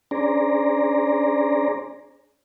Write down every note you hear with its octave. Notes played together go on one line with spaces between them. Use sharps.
C#4 D4 G#4 C5 D5 A#5